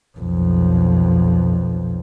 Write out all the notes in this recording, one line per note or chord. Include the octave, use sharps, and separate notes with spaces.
B1 F2